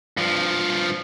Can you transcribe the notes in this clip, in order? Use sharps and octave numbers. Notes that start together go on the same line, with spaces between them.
G2 F3